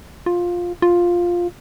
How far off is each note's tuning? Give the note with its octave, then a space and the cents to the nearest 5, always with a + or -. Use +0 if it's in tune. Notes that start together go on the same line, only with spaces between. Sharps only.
F4 +10
F4 +5